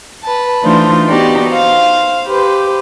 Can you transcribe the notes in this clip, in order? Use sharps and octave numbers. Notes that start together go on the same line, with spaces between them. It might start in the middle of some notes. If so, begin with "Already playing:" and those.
B4 A5
E3 A3 D4 D#4 F4 C5
B3 D#4 F#4 G4 D5
C5 F5
G4 B4 C5